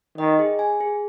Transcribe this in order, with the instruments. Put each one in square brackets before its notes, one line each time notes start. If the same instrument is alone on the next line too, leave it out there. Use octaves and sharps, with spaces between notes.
[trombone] D#3 [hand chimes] D#5
[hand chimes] G#4
G#5
G#4